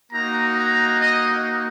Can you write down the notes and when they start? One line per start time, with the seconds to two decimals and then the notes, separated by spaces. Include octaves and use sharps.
0.11 A#3 D#4 F#4 A#5
0.55 A#5
1.00 D#5